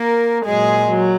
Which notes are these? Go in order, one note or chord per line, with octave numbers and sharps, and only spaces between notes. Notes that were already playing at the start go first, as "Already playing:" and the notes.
Already playing: A#3 A#4
A#2 F#3 G#3 G#4
F#3